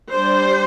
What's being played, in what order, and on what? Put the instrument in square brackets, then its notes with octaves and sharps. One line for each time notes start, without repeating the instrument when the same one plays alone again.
[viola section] G3 D4 C5